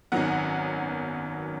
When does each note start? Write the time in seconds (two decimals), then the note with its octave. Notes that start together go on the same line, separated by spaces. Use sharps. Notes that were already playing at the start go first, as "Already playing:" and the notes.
0.12 G#1 F#2 D#3 F#3 B3 F#5